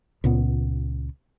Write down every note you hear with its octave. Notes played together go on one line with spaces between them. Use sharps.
C#2 A#2 B3